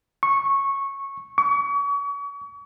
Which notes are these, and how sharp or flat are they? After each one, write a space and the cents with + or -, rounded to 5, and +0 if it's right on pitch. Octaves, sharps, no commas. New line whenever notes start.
C#6 -10
C#6 +40